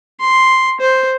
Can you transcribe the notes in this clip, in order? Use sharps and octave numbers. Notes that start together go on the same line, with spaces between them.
C6
C5